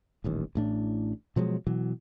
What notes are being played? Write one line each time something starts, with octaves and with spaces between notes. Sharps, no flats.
D#1 A1 D#2
A1 A2 D4
B2 F3 F#3 G#3
B2 E3 F#3